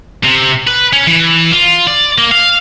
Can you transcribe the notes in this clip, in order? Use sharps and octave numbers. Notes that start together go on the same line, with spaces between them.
C3
B4
C#4
E3
F4
D5
A#3
F5